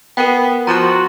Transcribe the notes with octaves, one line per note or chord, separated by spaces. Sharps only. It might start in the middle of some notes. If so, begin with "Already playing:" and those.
B3 A#4 G5
F3 F#4 A#5 F#6